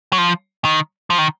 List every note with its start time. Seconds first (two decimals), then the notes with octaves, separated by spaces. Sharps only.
0.13 F#3
0.18 F3
0.65 D#3
1.10 F3
1.18 D#3